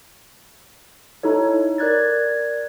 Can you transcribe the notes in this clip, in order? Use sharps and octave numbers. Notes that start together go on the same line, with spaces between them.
D#4 E4 A4 C#5
A#4 D5 F#6 G#6 A6